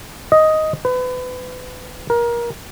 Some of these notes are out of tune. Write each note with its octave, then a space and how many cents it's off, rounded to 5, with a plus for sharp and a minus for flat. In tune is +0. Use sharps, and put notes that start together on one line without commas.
D#5 +5
B4 +30
A#4 +25